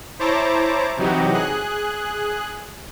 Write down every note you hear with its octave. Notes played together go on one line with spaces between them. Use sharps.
E4 C5 C#5 A5 A#5 D6
C3 E3 F#3 D#4 F#4 G4
G#4 F#6